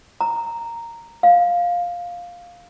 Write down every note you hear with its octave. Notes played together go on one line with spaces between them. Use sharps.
A#5
F5